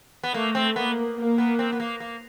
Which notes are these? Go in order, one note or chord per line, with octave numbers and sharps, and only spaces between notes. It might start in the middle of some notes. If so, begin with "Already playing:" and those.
B3
A3 A#3
C4
A#3 B3
A#3
B3
C4
B3
A#3
A#3